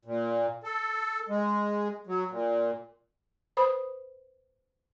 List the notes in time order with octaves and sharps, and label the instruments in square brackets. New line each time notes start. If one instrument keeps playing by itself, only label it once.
[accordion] A#2
A4
G#3
F#3
A#2
[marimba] B4 C5 B5 D#6